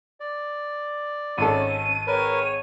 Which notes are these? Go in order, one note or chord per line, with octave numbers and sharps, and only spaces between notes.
D5
G#1 C#4 A4 D#7
C4 G#4 A#4 B4 C#5 D#7